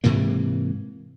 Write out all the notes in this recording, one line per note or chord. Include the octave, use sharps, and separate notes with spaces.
G#2 C3 E3 A#3